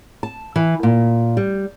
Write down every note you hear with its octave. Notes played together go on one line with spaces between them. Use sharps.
A5
E3
A#2
G3